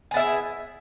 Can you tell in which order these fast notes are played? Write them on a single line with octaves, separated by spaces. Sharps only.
G#4 B3 E5 E4